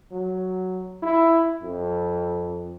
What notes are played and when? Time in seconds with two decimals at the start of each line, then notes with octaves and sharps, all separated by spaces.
0.12 F#3
1.03 E4
1.62 F2